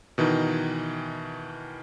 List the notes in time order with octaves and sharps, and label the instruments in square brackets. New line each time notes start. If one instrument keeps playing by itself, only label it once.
[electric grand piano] B2 D#3 E3 D#4